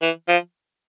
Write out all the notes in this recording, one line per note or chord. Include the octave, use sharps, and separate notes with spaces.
E3
F3